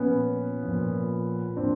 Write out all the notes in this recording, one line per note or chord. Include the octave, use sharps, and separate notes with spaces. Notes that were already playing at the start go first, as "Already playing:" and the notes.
Already playing: A#2 F3 B3 C#4
F3
A#2
A#2 F3 C4 D4